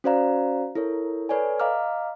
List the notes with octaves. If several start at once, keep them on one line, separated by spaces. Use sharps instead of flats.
C#4 F#4 C5 D5 F5 A#5
E4 A4 A#4 C#5
A4 B4 C#5 D5 G#5
D#5 F5 A#5 D6 F6